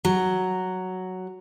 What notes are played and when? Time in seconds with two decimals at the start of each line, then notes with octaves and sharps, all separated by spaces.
0.05 F#3